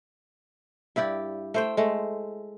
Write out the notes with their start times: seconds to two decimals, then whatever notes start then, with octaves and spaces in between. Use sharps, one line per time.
0.96 G2 E4 G4 D5
1.54 A3 C5 G5
1.77 G#3 A3